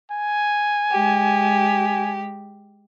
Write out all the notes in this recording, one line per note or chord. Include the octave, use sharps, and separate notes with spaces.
G#5
G#3 G4